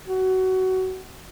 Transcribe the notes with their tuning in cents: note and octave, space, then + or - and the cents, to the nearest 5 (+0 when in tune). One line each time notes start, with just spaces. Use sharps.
F#4 +20